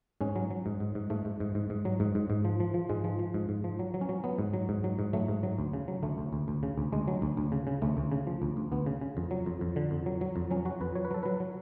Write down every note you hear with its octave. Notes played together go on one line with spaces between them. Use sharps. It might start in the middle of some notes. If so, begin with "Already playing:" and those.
G#2 C#4
F#3
F#3
G#2
G#2
G#2
G#2 A3
G#2
G#2
G#2
G#2
F#3
G#2
G#2
G#2
F3
F3
F3
G#2 G#3
F3
F3
G#2
G#2
F3
F#3
F#3
C#4
F#3
F#3 B3
G#2
F#3
G#2
F#3
G#2
F#3 A3
G#2
F#3
D2
C#3
F#3
D2 A3
D2
D2
D2
C#3
D2
D2 G#3
F#3
D2
D2
C#3
C#3
D2 A3
D2
C#3
F3
D2
D2
D2 B3
C#3
C#3
F2
F#3
F2
F2
D3
F2
F#3
F#3
F2
F#3 C#4
F#3 F#4
F2 B4
F#3 C#5
B4
F#3 A4
F#3 B4
F#3